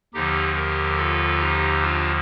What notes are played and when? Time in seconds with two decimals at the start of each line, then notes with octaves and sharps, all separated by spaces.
0.14 D#2 D3 F3 D#4 G4
0.56 G4 A#4
0.98 F4 A4
1.40 D#4 G4
1.82 D4 F4